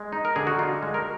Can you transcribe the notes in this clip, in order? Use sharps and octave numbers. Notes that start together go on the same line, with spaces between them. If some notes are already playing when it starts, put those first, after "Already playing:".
Already playing: G#3
D#4
A#4
D3 G#4
F#4
D#4 F4
G#3
A#4